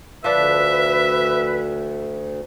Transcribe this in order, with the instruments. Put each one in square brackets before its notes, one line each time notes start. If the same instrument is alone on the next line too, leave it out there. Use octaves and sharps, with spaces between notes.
[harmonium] D2 [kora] F3 D4 [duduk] B4 [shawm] E5